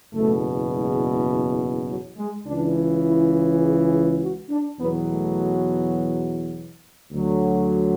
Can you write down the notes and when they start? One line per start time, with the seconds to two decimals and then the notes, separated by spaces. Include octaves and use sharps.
0.13 F#1 E2 B2 A3
0.72 G#3
1.88 F#3
2.17 G#3
2.47 C#2 C#3 E3 D4
3.05 E4
3.63 G#4
3.92 G#4
4.21 F#4
4.50 D4
4.79 E2 B2 F#3 B3
5.08 A3
7.12 D2 D3 F#3